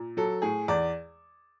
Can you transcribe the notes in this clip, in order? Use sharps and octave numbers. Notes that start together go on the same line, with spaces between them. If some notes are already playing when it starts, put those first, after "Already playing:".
Already playing: A#2
F#3 A4
A2 G#4
E2 D5